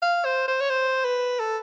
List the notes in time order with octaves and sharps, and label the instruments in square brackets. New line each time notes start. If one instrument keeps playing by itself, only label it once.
[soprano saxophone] F5
C5
C5
C#5
C5
B4
A4